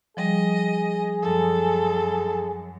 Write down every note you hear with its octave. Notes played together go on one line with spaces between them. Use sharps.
F3 G3 G#4 D#5
F#2 F3 A4